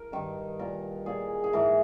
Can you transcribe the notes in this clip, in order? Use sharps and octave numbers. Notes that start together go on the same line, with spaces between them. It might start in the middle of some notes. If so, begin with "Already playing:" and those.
Already playing: A#4
G2 D#3
A#2 A#4
A#2 G#4
G#4
G#2 E3 A#4